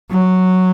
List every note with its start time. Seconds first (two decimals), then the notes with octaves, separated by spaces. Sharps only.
0.11 F#3